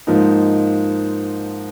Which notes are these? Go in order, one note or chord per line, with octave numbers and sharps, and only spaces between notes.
G#2 F3 A#3 D#4